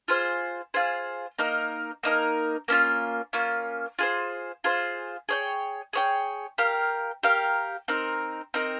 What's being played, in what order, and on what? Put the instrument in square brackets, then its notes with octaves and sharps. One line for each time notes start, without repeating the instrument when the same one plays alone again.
[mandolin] F4 G#4 C5
F4 G#4 C5
A#3 D#4 A#4
A#3 D#4 A#4
A#3 C#4 F4
A#3 C#4 F4
F4 G#4 C5
F4 G#4 C5
G#4 C#5 G5
G#4 C#5 G5
G4 A#4 F5
G4 A#4 F5
C4 D#4 A#4
C4 D#4 A#4